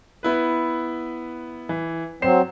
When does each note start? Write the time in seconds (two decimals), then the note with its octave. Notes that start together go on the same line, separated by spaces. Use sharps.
0.23 B3 E4 B4
1.69 E3
2.22 F#3 C4 C5 C7 E7